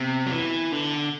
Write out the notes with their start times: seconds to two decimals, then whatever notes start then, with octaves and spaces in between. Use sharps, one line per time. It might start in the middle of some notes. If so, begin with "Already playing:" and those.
Already playing: C3 B3
0.26 F#3
0.31 E3
0.72 D3